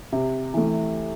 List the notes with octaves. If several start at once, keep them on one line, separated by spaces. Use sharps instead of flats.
C3
E3 A3